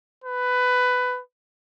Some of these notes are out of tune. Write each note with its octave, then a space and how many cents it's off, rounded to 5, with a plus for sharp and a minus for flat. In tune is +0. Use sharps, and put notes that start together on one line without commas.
B4 +15